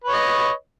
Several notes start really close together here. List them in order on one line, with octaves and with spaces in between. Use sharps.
B4 C#5 D#5